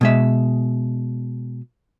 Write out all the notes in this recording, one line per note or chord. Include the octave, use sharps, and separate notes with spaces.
B2 G#3 E5